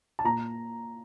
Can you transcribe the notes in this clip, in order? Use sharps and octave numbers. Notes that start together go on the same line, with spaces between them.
A5
A#2 A#5